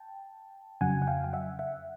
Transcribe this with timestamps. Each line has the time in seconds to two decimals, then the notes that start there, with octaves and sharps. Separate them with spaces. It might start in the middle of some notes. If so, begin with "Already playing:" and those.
Already playing: G5 A5
0.81 F2 C#3 F#3 F#5 G#5
1.02 F#5
1.07 F5 G5
1.24 G5
1.33 E5 F#5
1.59 E5 F#5